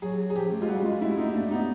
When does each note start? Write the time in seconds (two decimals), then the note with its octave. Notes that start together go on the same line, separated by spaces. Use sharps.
0.02 F#3 G#4
0.30 G#4
0.35 F3 G4
0.52 A3
0.61 G#3 F4
0.69 G3 F#4
0.84 G#3 F4
1.01 A3 E4
1.17 G#3 D#4
1.28 A#3
1.34 A3 D4
1.51 B3 D#4